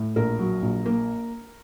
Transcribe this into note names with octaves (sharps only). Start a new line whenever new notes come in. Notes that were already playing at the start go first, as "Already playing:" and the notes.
Already playing: A2
A#1 A#4
F#3
A#1
A#3